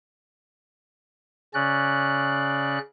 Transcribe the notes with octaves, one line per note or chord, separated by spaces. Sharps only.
C#3 C#4 D5 F#6